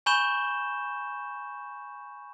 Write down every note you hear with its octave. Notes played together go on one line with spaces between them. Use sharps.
G#5 B5 C#6 G6 E7 G7